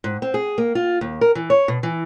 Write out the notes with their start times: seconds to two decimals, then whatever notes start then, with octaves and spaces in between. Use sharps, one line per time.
0.04 G#2
0.22 C4
0.34 G#4
0.58 A#3
0.75 F4
1.01 D#2
1.21 A#4
1.35 E3
1.50 C#5
1.68 B2
1.83 E3